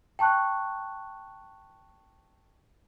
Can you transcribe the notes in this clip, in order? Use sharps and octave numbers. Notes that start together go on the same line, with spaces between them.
G5 A5 C#6 F#6